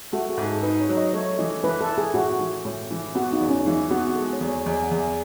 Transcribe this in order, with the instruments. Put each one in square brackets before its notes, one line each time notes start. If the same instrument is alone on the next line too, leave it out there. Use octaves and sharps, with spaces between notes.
[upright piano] A3 [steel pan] F#4
[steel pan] G#4
[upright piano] G#2
[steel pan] A4
[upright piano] D#4 [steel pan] B4
[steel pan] C#5
[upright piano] F#3
[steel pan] D#5
[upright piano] A3 [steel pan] C#5
[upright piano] E3 [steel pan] D#5
[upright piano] E3 [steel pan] B4
[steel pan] A4
[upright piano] E4
[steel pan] G#4
[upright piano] A2 [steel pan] F#4
[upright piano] E3
A2
E3
[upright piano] B3 [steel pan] F#4
[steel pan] D#4
[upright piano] E2
[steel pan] C#4
[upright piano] E3 [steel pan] D#4
[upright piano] B3 [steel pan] F#4
[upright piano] G#3 [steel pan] A4
[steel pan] C#5
[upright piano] E2
[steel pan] C#5
[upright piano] E2 [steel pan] D#5
[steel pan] F#5
[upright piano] E2
[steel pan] E5